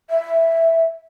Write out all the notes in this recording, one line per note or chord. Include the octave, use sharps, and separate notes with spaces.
E5